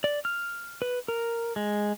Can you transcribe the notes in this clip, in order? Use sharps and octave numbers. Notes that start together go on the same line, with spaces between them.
D5
F6
B4
A#4
G#3